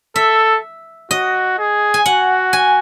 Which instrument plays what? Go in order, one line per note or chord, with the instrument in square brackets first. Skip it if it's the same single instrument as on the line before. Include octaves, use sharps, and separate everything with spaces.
[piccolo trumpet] A4 [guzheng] E5
[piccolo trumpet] F#4 [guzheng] D#5
[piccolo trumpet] G#4
[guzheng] G#5
[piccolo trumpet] F#4 [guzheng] F#5
[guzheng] G#5